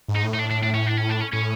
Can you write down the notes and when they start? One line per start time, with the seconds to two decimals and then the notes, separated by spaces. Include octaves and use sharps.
0.08 G#2
0.16 D#4
0.24 A2
0.34 D#4
0.39 D4
0.51 D4
0.63 D4
0.74 C#4
0.86 D4
0.97 C#4
1.09 D4
1.20 C#4
1.33 A2 C#4